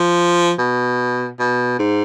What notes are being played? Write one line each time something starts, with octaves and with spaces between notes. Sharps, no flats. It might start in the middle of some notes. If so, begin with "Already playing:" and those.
Already playing: F3
B2
B2
G#2